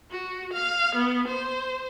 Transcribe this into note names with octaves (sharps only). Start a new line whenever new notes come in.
F#4
F5
B3
C5